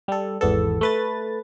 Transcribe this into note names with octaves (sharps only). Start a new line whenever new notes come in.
G3 A4
G#1 E2 B3 A4
A3 B4 A6